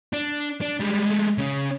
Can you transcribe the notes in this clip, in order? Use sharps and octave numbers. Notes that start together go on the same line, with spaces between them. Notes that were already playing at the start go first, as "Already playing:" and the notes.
D4
D4
G3 G#3
G#3 A3
C#3 C#4